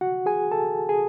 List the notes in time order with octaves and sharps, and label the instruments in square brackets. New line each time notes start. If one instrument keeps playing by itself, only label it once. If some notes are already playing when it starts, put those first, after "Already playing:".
[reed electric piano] F#4 F#5
G#4 G#5
A4 A5
G#4 G#5